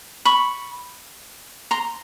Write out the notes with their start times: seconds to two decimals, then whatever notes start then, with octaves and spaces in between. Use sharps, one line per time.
0.25 B5 C#6
1.71 A#5 C6